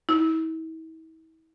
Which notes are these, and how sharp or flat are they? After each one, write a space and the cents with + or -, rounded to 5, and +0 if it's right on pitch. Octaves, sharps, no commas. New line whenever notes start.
E4 -40